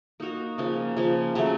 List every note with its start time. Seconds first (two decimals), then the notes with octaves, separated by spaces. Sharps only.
0.20 A#3 D#4 F#4 A#4
0.58 C#3 F3 A#3
0.96 C#3 F3 A#3
1.35 C#3 F#3 A3